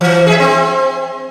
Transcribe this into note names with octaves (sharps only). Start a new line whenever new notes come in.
E3
G#4 E5
C4